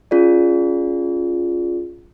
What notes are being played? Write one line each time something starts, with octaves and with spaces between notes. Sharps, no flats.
C#4 F4 G#4 D5